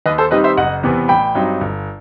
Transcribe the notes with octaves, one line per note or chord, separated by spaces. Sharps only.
D#2 B4 D#5
A4 C5
D#3 G3 C4 D#4 B4 D#5
C5 E5
F#1 D#5 F#5
E2 C3 E3 B3
A1 G5 B5
G2 F#3 C4 D#4
G1